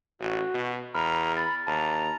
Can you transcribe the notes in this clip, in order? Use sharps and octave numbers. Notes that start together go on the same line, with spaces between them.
A1 F#4
B2
E2 A#5 B5 F6
B5 A6
D#2 A5 A#5